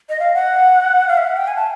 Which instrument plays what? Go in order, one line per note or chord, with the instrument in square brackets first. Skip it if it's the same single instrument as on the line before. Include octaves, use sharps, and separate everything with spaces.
[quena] D#5
F5
F#5
F5
E5
F#5
G5
G#5
A5